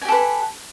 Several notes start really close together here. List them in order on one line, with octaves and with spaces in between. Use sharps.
G#5 G4 A4 B4